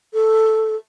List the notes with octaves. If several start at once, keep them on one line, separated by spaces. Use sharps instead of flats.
A4